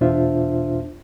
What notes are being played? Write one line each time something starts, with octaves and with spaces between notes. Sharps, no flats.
E2 B2 D4 F4 C5 E5